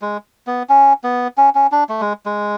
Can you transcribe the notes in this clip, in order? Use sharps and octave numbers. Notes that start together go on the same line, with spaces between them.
G#3
B3
C#4
B3
C#4
C#4
D4
A3
G#3
G#3